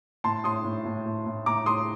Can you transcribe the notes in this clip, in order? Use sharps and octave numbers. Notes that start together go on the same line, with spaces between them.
A2 A5 C6
A2 C6 D#6
A2
A2
A2
A2
A2 A#5 D6
A2 C6 D#6